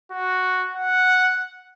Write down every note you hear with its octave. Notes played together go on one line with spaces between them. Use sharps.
F#4
F#5